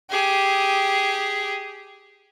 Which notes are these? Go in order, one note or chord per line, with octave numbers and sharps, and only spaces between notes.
G4 G#4